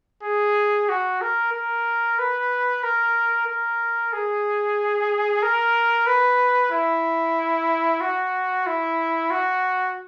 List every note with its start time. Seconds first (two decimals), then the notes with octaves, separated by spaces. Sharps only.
0.23 G#4
0.89 F#4
1.21 A#4
1.53 A#4
2.19 B4
2.83 A#4
3.47 A#4
4.13 G#4
5.43 A#4
6.07 B4
6.72 E4
8.01 F#4
8.67 E4
9.31 F#4